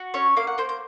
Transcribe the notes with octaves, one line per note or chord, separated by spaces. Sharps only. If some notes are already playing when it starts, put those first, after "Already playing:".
Already playing: F#4
C#4 C#5
A#3 F5
F#5
A#3 C5
C5